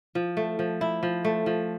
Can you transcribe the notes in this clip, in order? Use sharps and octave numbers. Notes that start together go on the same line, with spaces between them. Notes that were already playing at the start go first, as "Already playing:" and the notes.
F3
A3
F3
E4
F3
A3
F3